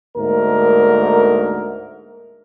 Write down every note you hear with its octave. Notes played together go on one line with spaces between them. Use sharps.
D2 G#2 D3 A3 A#3 A#4